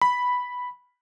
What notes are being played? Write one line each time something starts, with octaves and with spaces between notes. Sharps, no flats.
B5